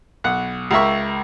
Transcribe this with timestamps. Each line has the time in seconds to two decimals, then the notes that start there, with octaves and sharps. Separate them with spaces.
0.24 B1 F#5
0.71 C#2 A#4 E5 C#6